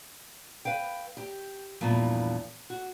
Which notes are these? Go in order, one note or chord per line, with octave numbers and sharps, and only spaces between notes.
B4 F5 G5
G4
E2 G2 A#2 E3 F3
F#4